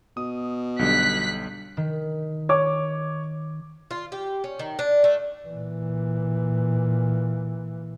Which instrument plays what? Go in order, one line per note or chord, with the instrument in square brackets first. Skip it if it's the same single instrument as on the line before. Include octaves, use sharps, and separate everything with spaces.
[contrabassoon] B2 [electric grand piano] D#6
[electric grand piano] B1 D3 G3 [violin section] F#6 B6
[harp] D#3
[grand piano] C#5 D6
[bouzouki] F4
G4
C#4
D#3
D4
A3
[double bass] A#2 E3